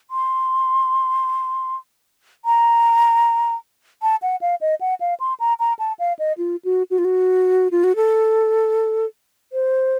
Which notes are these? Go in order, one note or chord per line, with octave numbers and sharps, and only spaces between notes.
C6
A#5
A5
F#5
F5
D#5
F#5
F5
C6
A#5
A#5
A5
F5
D#5
F4
F#4
F#4
F4
F#4
F4
F#4
A4
C5